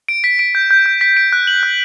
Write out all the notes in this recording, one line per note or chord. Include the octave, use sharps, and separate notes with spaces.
D7
B6
D7
G6
G6
G6
B6
D7
F#6
F#7
F#6